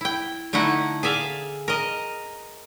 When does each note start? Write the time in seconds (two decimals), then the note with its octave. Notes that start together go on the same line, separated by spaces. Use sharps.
0.01 E4 G5
0.53 D3 A3 D#4 E4 F#5
1.03 G#4 D5 E5 F5
1.68 A#4 D#5